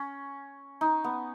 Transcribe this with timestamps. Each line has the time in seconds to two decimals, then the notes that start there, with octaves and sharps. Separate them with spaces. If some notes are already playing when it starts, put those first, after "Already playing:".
Already playing: C#4
0.81 D#4
1.04 B3